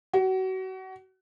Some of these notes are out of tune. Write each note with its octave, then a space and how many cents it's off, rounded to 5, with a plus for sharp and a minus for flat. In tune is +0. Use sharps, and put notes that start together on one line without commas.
F#4 +30